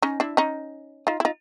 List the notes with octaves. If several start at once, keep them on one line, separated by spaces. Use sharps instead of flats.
C#4 D#4
D4 E4
C#4 D#4
D#4 F4
E4
D#4 F4